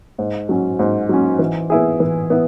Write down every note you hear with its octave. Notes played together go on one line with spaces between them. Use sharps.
G#2
F#3 C#4
G#2
F#3 C#4
E3
B3 E4 G#4
E3
B3 E4